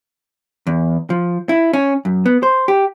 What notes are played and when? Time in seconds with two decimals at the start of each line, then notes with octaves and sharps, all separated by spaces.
0.67 E2
1.10 F3
1.49 E4
1.73 C#4
2.05 F#2
2.26 B3
2.43 C5
2.68 G4